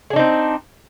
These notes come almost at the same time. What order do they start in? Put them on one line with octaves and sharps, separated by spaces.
G#4 D4 D#4 C4